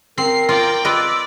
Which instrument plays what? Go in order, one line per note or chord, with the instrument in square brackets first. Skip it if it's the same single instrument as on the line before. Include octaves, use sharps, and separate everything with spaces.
[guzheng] C4 [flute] A#4 [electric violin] C7
[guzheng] F4 [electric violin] D5 G5
[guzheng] F4 B4 D#5 [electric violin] D5 [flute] E6